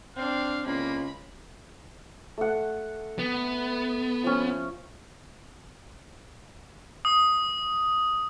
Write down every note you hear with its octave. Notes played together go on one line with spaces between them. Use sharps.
C4 D4 F5
C#2 A#3 B5
A3 F#5
B3
F3 C#4
D#6